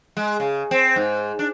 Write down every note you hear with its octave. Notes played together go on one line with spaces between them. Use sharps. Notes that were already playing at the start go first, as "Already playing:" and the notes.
G#3
C#3
C4
G#2
D4